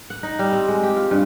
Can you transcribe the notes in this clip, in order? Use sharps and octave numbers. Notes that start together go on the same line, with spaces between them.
F#5
D#4
G3
C4
G#3
G4
F4
G2